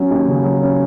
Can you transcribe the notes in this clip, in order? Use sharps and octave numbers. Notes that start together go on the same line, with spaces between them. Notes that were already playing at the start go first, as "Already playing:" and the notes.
Already playing: F#3 C#4
D#2
C#3
F#3
C#4